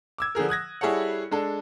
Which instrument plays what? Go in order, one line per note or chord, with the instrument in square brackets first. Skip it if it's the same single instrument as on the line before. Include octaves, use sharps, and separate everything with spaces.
[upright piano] D6 E6 G#6
D3 F3 G#4 A#4
D#6 F#6 G#6 A#6
G3 E4 G#4 A4 C#5 F#5
G#3 D4 A4